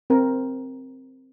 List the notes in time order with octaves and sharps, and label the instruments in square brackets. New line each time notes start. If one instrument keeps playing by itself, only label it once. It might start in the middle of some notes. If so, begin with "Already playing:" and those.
[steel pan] C4 A#4